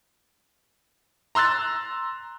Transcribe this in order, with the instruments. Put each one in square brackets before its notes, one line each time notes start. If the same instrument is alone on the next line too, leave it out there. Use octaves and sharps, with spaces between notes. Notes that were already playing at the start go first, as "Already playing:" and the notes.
[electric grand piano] A#5 C6 E6 F#6 A6